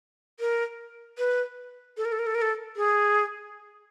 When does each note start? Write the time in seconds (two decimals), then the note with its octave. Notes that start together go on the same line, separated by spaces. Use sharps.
0.40 A#4
1.18 B4
1.97 A4
2.05 A#4
2.12 A4
2.19 A#4
2.27 A4
2.35 A#4
2.42 A4
2.76 G#4